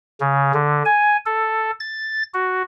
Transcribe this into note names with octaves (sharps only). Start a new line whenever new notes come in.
C#3
D3
G#5
A4
A6
F#4